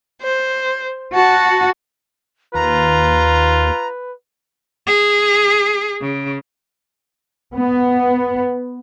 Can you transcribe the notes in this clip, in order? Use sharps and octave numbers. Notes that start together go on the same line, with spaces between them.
C5
F#4 A5
D#2 F4 B4 A#5
G#4
C#3
B3